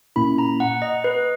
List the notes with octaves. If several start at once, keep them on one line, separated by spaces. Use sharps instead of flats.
A#2 A#3 C#4 E4 B5
A#5
F#5
D#5
B4